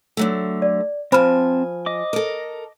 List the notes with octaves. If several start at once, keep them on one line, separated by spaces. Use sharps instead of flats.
D3 F#3 A3
D5
F3 C4 C5 G#5 A5 B5 F6
D#5 D6
A4 A#4